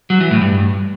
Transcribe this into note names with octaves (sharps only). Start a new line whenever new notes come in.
F#3
E3
A2
G2